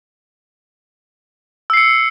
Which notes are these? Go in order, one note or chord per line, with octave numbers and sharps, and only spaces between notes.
E6 C7 C#7